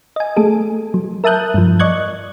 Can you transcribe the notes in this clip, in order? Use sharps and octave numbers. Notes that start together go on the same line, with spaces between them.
D#5 G#5
A3 G#4 A4
F#3
A#4 E5 A5 D#6 F#6 G6
G2 F3
D5 D#5 C#6 F#6 G#6